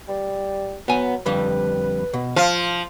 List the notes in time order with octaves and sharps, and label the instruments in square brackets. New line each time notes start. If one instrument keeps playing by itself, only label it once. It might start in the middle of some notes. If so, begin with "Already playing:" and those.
[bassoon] G3
[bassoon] F#3 [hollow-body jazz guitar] B3 G#5
[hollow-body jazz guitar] F2 D3 G3 [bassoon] B4
[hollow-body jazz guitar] B2
[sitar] F3 [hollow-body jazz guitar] F5